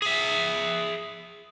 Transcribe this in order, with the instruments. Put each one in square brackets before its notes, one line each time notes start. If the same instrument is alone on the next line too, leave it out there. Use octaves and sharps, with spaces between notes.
[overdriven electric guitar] G#4 E5